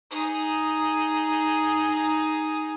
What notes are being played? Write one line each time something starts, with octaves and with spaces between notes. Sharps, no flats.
D#4 G#4